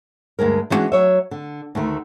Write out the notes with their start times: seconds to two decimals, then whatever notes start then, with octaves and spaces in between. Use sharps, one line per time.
0.39 D2 G2 G#3 A#4
0.70 E3 G3 G#3 C#4 D4 F#4
0.92 F#3 C#5 E5
1.31 D3
1.75 D2 D#3 A3